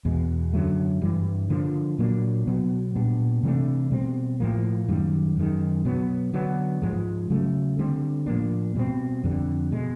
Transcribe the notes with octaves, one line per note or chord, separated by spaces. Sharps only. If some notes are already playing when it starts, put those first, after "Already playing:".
E2 B2 G#3
F#2 D3 F#3 A3
G2 E3 G3
D3 F3 A#3 D4
A#2 F#3 A#3 D4
B2 F#3 B3
A#2 G3 B3 D4
C3 E3 A3 D4
B2 G3 C4
A2 F3 A#3
F#2 D#3 G3
F#2 D#3 G#3
B2 F#3 B3
D3 F#3 B3 D4
G#2 F3 G#3
C#3 F#3 A3
D3 G3 C4
A2 F3 A#3 D4
B2 G3 C4
F2 D3 G3
B2 G#3